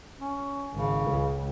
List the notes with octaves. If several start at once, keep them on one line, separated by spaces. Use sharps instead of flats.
C#4
G#1 C#3
C#2